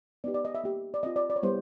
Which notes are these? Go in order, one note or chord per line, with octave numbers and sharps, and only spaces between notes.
B3 D#4 G4 D5
D5
D#5
E5
A#3 D#4 G4
D5
C4 F4 D#5
D5
D5
C#5
G3 B3 E4 C5